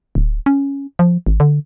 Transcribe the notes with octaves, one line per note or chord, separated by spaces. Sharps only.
D1
C#4
F3
G#1
D3